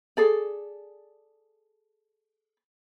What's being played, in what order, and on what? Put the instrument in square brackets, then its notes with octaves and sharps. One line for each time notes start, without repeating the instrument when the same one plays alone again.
[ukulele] G#4 A4 D5